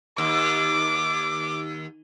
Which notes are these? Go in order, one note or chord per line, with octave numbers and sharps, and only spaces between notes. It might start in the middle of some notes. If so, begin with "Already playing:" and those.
D#2 D6